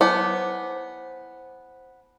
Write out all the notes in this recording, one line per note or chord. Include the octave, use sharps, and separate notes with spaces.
B3 E4 C5 C#5 G#5 A5 D6